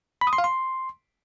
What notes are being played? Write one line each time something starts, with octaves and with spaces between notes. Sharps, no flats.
B5
D#6
C6
F5
C6